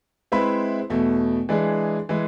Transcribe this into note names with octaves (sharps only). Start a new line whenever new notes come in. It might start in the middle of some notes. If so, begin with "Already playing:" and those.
G#3 C4 E4 B4 E5
E2 B2 A3
E3 G#3 D4 G#4
E3 G#3